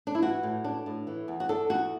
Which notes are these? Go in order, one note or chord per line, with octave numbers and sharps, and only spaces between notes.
D4
E4
E3 F#4
A2
D4
A2
E3
E2
F#4
D4 A4
E2 F#4